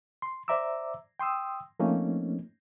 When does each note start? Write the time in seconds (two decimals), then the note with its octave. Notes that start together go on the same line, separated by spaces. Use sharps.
0.22 C6
0.48 C5 D5 E5 A#5 D6 E6
1.19 G5 C6 D#6 E6
1.79 F3 A3 A#3 C4 C#4 D#4